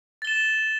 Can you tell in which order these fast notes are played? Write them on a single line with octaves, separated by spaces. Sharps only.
A6 G7 E7